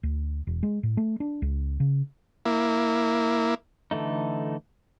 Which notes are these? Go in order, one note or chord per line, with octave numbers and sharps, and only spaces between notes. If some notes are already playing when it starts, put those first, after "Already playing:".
D2
E1
G#3
A2
A3
D4
C#2
C#3
A#3 E4
D3 E3 A3 D#4